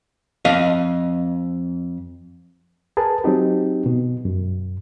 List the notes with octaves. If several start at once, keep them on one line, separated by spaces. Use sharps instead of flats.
F2 D#5 F5
G#4 A#4 B4 A5
F#3 C4 D#4 G4
B2
F#2